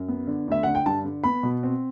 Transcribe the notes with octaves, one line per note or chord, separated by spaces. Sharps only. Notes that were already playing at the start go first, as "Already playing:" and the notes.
Already playing: F#2
B3
D3
D2 E5
D3 F#5
G5
G2 A5
D3
B3 B5
B2
C4